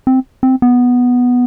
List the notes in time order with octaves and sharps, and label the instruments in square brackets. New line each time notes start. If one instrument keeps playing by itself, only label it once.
[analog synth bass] C4
C4
B3